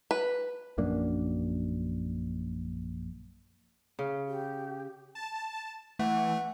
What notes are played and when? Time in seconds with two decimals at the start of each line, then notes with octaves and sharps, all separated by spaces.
0.11 B4
0.78 A#1 F#2 A#3 D4
3.99 C#3
4.27 G4
5.15 A5
5.99 E3 A3 F#5